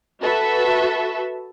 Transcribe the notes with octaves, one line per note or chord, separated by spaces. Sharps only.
F#4 A4 B4 E5